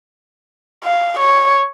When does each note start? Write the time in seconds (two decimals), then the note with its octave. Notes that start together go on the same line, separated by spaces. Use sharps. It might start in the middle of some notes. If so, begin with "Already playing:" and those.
0.84 F5
1.19 C#5